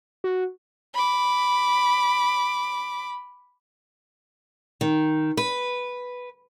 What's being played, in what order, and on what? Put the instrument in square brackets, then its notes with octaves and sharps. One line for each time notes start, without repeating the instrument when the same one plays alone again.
[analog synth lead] F#4
[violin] B5 D6
[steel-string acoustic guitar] D#3
B4